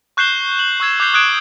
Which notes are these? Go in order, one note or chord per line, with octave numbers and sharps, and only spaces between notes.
C#6 F#6 G6 C7 E7 G7
F#7
C#6 E6 G#6 E7
D6 F#6 G6 C7 G7
D#6 F#6 G#6 D7 E7